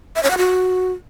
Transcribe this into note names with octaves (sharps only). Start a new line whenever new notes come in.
E5
C#5
F#5
F#4